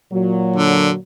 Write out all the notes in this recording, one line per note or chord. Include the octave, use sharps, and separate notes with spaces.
A#2 F#3
D3